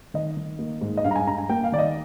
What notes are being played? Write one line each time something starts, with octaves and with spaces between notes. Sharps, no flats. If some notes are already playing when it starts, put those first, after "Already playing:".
D#3 D#5
D#3
A#3
G#2
D#5
G2 F5
A#5
G#5
G2 A#5
G#5
A#3 G5
F5
D#3 D5
D#5